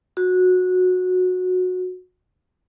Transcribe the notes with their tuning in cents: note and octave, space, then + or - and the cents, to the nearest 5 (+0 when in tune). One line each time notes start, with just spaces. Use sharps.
F#4 -15